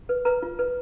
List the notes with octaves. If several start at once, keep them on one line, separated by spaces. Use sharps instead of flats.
B4
B4 A#5
F4
B4